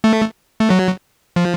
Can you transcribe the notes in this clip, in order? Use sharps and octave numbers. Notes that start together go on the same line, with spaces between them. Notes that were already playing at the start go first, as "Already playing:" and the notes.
A3
A3
F#3
F3